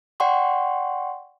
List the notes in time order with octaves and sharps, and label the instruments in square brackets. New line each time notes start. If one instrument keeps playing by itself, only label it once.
[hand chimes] D5 F#5 G5 C6 C#6